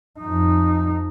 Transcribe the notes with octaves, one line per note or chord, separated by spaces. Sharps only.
F2 D#4